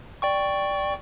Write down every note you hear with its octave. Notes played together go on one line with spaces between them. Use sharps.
D5 G5 C#6